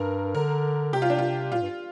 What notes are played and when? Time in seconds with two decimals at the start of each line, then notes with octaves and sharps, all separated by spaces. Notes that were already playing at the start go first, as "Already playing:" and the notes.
Already playing: G2 A#4
0.35 D3 A#4
0.93 C3 G4
1.02 F4
1.10 D4
1.18 F4
1.52 A#2 F4
1.62 G2